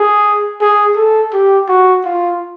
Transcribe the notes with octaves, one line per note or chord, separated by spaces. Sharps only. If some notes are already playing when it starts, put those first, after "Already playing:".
Already playing: G#4
G#4
A4
G4
F#4
F4